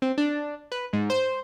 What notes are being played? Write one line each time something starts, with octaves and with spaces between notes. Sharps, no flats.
C4
D4
B4
G#2
C5